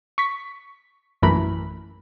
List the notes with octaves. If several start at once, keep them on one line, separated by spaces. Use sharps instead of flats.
C#6 B6
A#1 F#2 E3 A3 A#4 B5